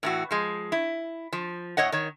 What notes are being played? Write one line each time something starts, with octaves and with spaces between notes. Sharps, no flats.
A2 E3 F#4
F3 G#3
E4
F3
A2 C#5 D#5 F#5
D#3 C#5